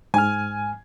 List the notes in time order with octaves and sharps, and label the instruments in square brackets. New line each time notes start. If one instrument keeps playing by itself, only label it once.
[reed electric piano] G#2 F6 [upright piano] G#5